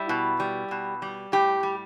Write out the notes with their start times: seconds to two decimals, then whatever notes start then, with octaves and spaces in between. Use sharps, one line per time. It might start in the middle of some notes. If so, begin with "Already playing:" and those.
Already playing: G3 E4
0.09 B2
0.40 G3
0.71 B2
1.02 G3
1.32 A2 G4
1.63 G3